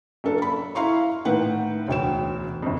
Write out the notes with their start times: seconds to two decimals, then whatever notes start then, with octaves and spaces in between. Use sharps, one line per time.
0.24 F#2 A#3 D4 A4
0.42 B5
0.75 E4 F5 A#5 C6 C#6
1.25 A2 D#3 B4 F#5
1.88 E1 D2 G5 E7
2.62 G1 F2